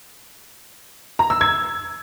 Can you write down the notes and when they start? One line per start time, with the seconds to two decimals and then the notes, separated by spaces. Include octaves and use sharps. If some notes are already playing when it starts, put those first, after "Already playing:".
1.19 A#5
1.30 E6
1.41 G#6